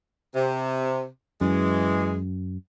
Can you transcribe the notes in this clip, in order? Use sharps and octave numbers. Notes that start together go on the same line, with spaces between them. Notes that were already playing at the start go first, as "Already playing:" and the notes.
C3
F#2 E3 G#3